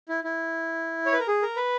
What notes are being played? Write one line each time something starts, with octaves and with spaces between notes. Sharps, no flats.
E4
E4
C#5
B4
A#4
G#4
A#4
B4